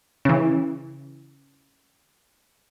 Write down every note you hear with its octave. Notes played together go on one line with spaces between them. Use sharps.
C#3 E3